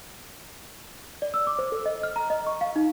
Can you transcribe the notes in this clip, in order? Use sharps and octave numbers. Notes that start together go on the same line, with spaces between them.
D5
E6
D6
C5
A4
D#5
F6
A#5
D#5
C#6
F5
D#4